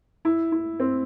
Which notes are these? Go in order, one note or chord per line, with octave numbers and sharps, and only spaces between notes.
E4
E4
C4